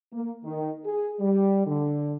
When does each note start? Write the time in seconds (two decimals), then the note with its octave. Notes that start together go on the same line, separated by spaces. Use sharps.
0.13 A#3
0.44 D#3
0.85 G#4
1.20 G3
1.67 D3